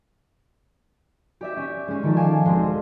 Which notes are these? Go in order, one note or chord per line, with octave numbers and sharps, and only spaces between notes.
G4 D5 E5
C#4
G#3 C#4
D#3 F3 A4
D5 F5 G#5 E7
E1 G#3 C4